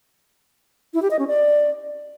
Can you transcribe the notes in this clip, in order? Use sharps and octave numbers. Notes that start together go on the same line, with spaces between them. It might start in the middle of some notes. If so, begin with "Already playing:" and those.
E4
G4
D#5
C#4
D5